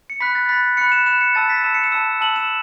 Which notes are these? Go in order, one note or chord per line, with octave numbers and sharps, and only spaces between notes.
C#7
B5 F#6 B6
A6
B5 F#6 B6
B5 F#6 C#7
E7
B5 F#6 E7
C#7
A5 E6 A6
B6
A5 E6 E7
C#7
E7
A5 E6
A5 E6 F#7
E7